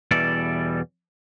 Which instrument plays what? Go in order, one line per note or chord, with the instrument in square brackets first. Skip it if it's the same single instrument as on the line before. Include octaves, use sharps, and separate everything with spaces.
[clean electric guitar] E2 B2 E3 G3 A4 D5